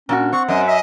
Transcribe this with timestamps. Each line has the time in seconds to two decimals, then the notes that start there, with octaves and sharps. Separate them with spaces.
0.09 A#2 C#4 D4 F#4
0.33 C4 F#5 C#6
0.48 F#2 D#5
0.68 D#5 E5